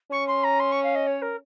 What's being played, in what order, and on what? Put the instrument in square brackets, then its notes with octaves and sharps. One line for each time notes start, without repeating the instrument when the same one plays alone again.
[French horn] C#4 [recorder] C#6
[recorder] C6
A#5
C6
C#6
F5
D#5
C#5
A#4